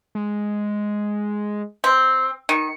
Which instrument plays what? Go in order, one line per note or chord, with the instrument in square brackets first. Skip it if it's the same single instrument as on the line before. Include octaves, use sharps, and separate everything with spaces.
[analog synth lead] G#3
[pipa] C4
[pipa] D#3 [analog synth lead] C#7